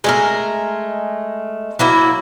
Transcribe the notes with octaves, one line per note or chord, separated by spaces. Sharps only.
G#3 A3 A#4
F#3 A#3 E4